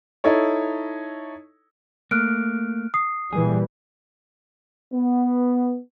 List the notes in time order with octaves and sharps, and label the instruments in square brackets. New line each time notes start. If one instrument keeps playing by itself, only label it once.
[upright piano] D#4 E4 A4 C#5
[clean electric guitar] A3 A#3 [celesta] F6 F#6 D7
[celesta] D#6 C7
[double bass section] A#2 E3 G3 [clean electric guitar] G#4
[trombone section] B3